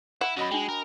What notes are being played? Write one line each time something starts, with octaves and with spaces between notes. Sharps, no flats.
E4 F#5
F#2 F#4 D#5 B5
G#3 D4 G5
A#4